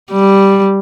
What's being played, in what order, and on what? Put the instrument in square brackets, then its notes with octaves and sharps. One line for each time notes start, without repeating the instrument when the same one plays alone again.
[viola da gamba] G3